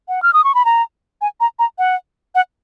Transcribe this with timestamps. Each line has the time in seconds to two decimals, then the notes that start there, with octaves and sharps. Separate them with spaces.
0.08 F#5
0.23 F6
0.33 D#6
0.44 C#6
0.55 B5
0.65 A#5
1.21 G#5
1.40 A#5
1.59 A#5
1.79 F#5
2.35 F#5